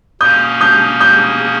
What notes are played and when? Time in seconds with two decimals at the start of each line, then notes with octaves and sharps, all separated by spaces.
0.21 B2 A#3 C#4 D#6 G6
0.61 D#6 G6
1.00 D#6 G6